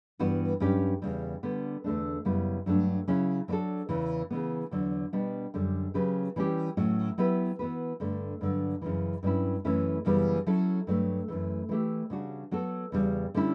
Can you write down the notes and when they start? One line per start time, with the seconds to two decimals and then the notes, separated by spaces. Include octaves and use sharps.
0.19 G2 E3 G3 B3 F#4
0.60 G2 F#3 C#4 G4
1.02 E2 C#3 G3
1.43 D3 G3 B3
1.84 E2 D3 A3 D4
2.25 F#2 C#3 G3 B3 E4
2.66 G2 F#3 A3 D4
3.08 C#3 F#3 C#4 E4
3.48 F#3 B3 D4 F#4 A4
3.89 E2 C#3 E3
4.30 C#3 E3 B3
4.71 E2 D3 F#3
5.13 B2 G3 B3 D4
5.54 F#2 D3 G3
5.94 C#3 F#3 C#4 G4 B4
6.36 E3 G3 C#4 G4
6.77 A2 F#3 C#4 F#4
7.18 F#3 B3 E4 G4 B4
7.59 E3 B3 F#4 B4
8.00 G2 D3 A3
8.41 G2 D3 F#3
8.82 F#2 C#3 E3
9.23 G2 F#3 C#4 E4
9.65 F#2 E3 A3 C#4 E4
10.05 F#2 C#3 E3 G3 B3
10.47 F#3 C#4 E4 A4
10.87 G2 F#3 A3
11.28 F#2 E3 A3
11.69 E3 A3 E4 G4
12.10 C#3 G3 D4 F#4
12.51 F#3 B3 F#4 A4
12.92 E2 C#3 G3
13.34 D3 G3 C#4 E4